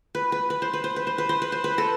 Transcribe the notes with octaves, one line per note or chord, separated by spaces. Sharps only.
B4
B4
B4
C5
B4
C5
B4
C5
B4
C5
B4
C5
B4
A4